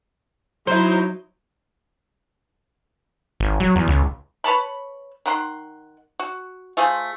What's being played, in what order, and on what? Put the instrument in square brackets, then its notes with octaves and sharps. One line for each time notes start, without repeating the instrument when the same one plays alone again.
[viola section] F#3 D#4 [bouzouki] E4 C5
[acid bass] G#1
F#3
E2
C#2
[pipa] B4 C#5 A5 B5
D#3 F#5 B5 C6
F#4
A3 F4 G#4 C5